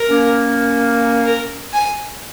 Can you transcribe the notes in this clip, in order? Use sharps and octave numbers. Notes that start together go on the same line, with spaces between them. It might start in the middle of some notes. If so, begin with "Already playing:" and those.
Already playing: A#4
A#3 C#4
A#4
G#5